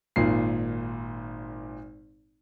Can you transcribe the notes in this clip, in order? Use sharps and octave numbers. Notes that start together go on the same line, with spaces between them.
G#1 A#2 C7